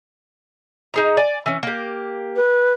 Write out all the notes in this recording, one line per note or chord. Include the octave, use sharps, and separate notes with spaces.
D#4 G#4 A#5
D5 G#5
E3 C#4
A#3 G4
B4